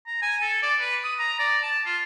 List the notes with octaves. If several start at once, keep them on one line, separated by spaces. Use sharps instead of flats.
A#5
G#5
A4
D5
B4
D#6
A#5
D5
A5
F4